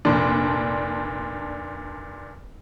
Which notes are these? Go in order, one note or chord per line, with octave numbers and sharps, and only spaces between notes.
F1 A#2 D4